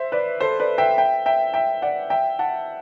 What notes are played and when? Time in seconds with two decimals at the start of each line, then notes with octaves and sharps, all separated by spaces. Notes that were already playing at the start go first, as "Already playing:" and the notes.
Already playing: C5 E5
0.12 B4 D5
0.41 A4 C5
0.60 B4 D5
0.78 E5 G5
0.97 E5 G5
1.26 E5 G5
1.54 E5 G5
1.82 D5 F#5
2.10 E5 G5
2.39 F#5 A5